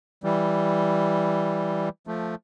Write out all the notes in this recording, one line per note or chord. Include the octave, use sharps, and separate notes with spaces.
E3 G3
F3 A3